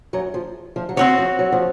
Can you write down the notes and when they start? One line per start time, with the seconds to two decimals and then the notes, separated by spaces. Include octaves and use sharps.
0.13 F#2 F#3
0.34 F3
0.76 F3
0.89 F#3
0.96 F3 C4 F#4 C#5
1.18 F3
1.39 F#3
1.52 F3